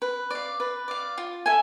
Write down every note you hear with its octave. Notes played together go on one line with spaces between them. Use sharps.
B4
D5 F5
B4
D5 F5
F4
A4 E5 G#5